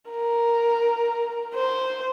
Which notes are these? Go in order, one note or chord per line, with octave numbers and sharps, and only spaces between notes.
A#4
C5